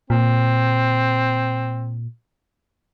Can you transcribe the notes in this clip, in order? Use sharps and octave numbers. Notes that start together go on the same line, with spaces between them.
A#2 C4